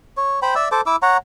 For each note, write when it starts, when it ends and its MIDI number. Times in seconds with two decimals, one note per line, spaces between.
0.17 0.40 73
0.42 0.54 72
0.42 0.54 79
0.42 0.54 83
0.55 0.69 74
0.55 0.69 76
0.55 0.69 88
0.72 0.81 69
0.72 0.81 72
0.72 0.81 81
0.72 0.81 86
0.86 0.96 64
0.86 0.96 86
0.86 0.96 88
1.02 1.17 73
1.02 1.17 78
1.02 1.17 82